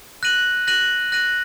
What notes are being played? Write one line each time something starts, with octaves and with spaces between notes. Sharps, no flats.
F#6 A#6 D#7 F#7
F#6 A#6 D#7 F#7
F#6 A#6 D#7 F#7